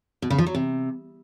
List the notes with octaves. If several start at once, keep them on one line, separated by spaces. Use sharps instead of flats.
B2
C#3
F3
F#3
C3